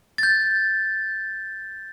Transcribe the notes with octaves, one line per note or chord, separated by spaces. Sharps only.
A6
G6